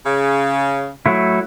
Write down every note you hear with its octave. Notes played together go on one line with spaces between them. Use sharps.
C#3
F#3 A3 E4